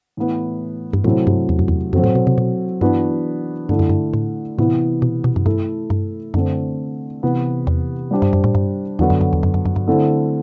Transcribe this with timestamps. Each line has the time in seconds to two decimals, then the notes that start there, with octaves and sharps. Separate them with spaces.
0.17 A2 E3 B3 E4
0.93 G2
1.04 A2 C3 F#3 A3 C4 E4
1.27 G2
1.49 E2
1.59 F#2
1.68 E2
1.93 F#2 F#3 C4 F#4 A4 C5
2.04 A2
2.15 B2
2.27 C3
2.38 B2
2.81 G2 E3 B3 D4 F#4
3.69 G2 D3 A3 E4
3.79 F#2
3.89 G2
4.13 A2
4.58 A2 C3 E3 B3 E4
5.02 B2
5.24 B2
5.36 F#2
5.46 G2 A3 E4 A4
5.90 G2
6.34 F#2 D3 A3 C4
7.22 C3 E3 B3 E4
7.67 E2
8.11 G3 D4 G4 C5
8.22 G2
8.33 F#2
8.44 A2
8.55 G2
8.99 E2 D3 F#3 B3 F#4 A4
9.10 F#2
9.21 F#2
9.33 E2
9.43 F#2
9.54 F#2
9.65 F#2
9.76 G2
9.87 D3 A3 C4 E4 A4